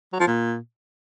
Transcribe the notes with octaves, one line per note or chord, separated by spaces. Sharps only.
F#3
F3
A#2